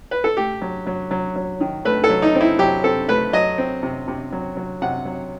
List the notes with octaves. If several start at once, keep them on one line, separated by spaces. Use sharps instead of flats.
B4
A4
A3 G4
F#3
F#3
F#3
F#3
D#3
A3 B4
A4
F#3
D#4
C4
E4
F#3 G4
C4 A4
A3 B4
F#3 D#5
C4
C3
C3
F#3
F#3
C3 F#5
F#3